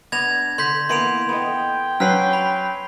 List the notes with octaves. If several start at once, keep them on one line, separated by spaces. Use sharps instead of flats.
B3 D4 G#6 A#6 F7
D3 C6 G6 B6
E3 A#3 B3 C6 D7 F7
B3 A4 D#5 G5
F#3 C#4 B4 F6 B6 C7
B5